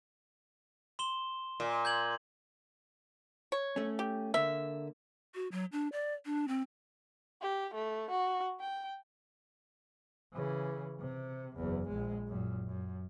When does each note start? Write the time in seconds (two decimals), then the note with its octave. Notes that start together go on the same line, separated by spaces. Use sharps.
0.99 C6 E7 G7
1.60 A#2
1.85 G6 G#6 F#7
3.52 C#5
3.76 A3 C#4
3.99 G4
4.34 D3 A#3 E5
5.35 F#4
5.52 F#3
5.72 D4
5.92 D5
6.26 D4
6.48 C4
7.42 G4
7.74 A3
8.11 F#4
8.60 G5
10.33 C#3 E3
10.99 C3
11.56 F#1 E2
11.89 A#1 G#3
12.28 F#2 A#2
12.67 F#2